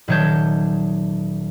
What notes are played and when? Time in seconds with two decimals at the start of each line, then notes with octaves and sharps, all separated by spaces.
0.08 D#1 D#3 F#3 C#5 A5 G6